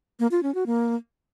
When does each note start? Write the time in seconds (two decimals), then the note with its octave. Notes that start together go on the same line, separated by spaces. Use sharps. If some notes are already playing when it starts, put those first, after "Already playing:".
0.20 A#3
0.31 F4
0.43 C#4
0.55 F#4
0.66 A#3